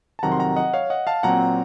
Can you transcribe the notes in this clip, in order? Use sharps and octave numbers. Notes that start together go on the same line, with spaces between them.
A5
F2 C3 D#3 F#3 F#5 A#5
C6
F#5 A#5
D#5 F#5
C#5 F5
D#5 F#5
F5 A5
A#2 F#3 C4 F#5 A#5